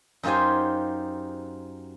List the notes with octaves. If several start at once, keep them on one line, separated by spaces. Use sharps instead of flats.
F#2 D#4 F4 G4 C5 G#5